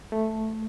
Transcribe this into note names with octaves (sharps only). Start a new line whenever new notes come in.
A3